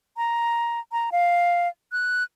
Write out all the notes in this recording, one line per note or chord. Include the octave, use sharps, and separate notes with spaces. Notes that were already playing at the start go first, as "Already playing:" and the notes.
A#5
A#5
F5
F#6